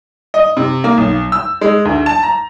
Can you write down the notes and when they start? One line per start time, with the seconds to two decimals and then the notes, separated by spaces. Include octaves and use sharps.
0.34 D#5
0.57 C3
0.84 A#3
0.97 B1
1.32 E6
1.61 G#3
1.85 D2
2.06 A5
2.23 A#5